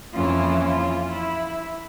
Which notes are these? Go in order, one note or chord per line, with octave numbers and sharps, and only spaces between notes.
F2 E3 A#3 C#4 E4 F4
F4
E4